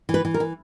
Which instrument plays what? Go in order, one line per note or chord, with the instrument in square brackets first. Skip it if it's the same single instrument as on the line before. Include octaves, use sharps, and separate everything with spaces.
[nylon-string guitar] E3
B4
E3
A#4
E3